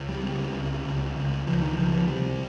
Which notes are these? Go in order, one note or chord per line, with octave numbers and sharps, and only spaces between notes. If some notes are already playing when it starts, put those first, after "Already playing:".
Already playing: C#2
G3
C#3 G3
C#2
C#2
C#2
C#2 F3
D#3
C#2 F3
F3
C2 G3